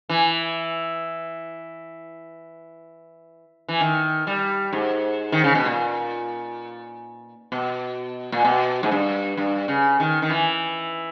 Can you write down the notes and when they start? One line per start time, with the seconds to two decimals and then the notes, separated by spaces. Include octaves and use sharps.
0.09 E3
3.68 E3
3.81 D#3
4.27 G3
4.73 G#2
5.32 D#3
5.44 C#3
5.55 B2
5.66 A#2
7.52 B2
8.32 A#2
8.45 B2
8.83 G#2
8.91 G2
9.37 G2
9.68 C#3
10.00 D#3
10.22 D#3
10.30 E3